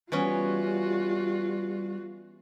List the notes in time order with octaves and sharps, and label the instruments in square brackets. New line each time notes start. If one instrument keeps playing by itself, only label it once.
[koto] E3 B3 C#4 [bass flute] G3 [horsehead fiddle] F4 F#4